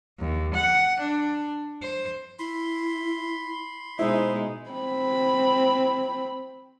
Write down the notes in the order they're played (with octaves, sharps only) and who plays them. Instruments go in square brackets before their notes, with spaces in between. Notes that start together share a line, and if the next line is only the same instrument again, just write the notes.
[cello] D#2
F#5
D4
C5
[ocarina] E4 [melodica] B5 C6
[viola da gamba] B2 G#3 D#4 [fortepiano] E4 [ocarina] C5
[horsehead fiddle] C4 B5